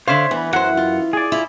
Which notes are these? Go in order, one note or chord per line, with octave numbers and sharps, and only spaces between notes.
D3 C5 C#5 E5 F5
D2 E3 B3
F#2 E3 F#3 C5 F#5
F4
G#4 D5
E4 F4